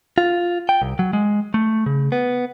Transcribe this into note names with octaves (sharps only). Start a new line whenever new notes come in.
F4
G5
C2
F#3
G#3
A3
C#3
B3